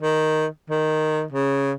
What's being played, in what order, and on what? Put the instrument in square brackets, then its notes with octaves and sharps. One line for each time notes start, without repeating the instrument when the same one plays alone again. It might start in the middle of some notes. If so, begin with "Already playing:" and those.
[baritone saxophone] D#3
D#3
C#3